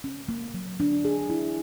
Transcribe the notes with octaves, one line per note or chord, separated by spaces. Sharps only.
C#4
A#3
F#3
D4
G#4
E4